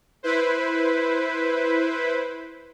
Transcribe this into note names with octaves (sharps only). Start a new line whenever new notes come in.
E4 B4 C5